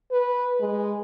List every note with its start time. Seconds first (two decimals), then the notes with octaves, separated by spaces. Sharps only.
0.12 B4
0.60 G#3